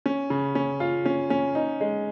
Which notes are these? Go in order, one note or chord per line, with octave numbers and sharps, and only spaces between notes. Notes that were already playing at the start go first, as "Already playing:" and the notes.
C#4
C#3
C#4
F4
C#4
C#4
D#4
G#3